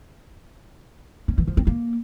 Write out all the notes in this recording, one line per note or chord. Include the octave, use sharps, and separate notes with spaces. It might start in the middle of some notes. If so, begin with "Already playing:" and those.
C#4
E3
F3
C4
A#3